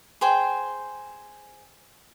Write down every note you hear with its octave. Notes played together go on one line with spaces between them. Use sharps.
G#4 C5 G5